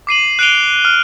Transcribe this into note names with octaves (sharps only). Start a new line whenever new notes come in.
D6 C7 D#7 F#7
F#6 C7 D7 D#7 F7 G7
F6